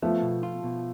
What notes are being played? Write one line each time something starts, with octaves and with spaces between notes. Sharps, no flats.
F3 A3 B3
B2
F4
B2